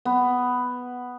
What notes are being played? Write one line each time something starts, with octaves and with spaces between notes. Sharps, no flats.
B3